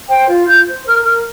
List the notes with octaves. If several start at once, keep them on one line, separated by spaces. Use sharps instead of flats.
C5 G5
F4
F4 G6
C5
A#4 F6
A#4 F6